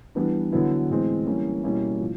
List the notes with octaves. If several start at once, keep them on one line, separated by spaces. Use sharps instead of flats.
E3 G3 B3 D4
D3 F#3 B3 E4
A2 E3 G#3 C4
E3 G3 A#3 C#4 E4
B2 G3 A#3 C#4 E4
A2 F3